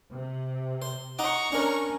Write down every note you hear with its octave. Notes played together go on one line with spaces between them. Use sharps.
C3
C5
D#4 F#5 A#5 C#6 D6
C#4 D4 A#4